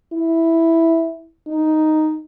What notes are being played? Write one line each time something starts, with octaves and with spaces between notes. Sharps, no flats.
E4
D#4